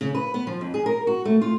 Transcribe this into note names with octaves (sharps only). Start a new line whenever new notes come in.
C#3
B4
B3
F3
F2
G#4
A#4
F#4
A3
F4